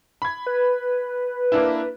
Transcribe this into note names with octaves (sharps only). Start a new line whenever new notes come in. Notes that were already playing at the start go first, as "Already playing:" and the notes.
B5 G#6
B4
A#3 D4 E4